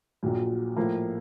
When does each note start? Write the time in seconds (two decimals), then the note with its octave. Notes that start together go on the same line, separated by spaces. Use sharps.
0.23 A#1 A#2 F#3
0.76 A2 F3 A#3